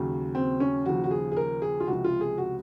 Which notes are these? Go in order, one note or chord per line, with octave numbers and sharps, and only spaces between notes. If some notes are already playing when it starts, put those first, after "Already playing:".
Already playing: D#2 C#3 F#3
C4
C#4
D#2 C#3 F3 F#4
F#4
G#4
G#4
A#4
G#4
F4
C#2 C3 F3 F#4
F4
G#4
F#4